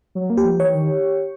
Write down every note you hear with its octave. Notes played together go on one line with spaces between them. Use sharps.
F#3
A#3
G4
F3
E3 C#5
D#3